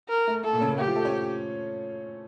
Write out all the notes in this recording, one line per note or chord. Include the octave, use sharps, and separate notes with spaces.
A#4
A3
A3 A4
A#2 A#3
C#3 C#4
A#2 A#3
A3 G4
F3 F4
A3 A4
C#4 C#5